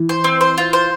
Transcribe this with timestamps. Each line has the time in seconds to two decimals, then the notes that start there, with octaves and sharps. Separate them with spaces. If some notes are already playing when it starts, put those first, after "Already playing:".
Already playing: E3
0.09 C5
0.24 C4
0.41 C5
0.58 F4
0.73 C5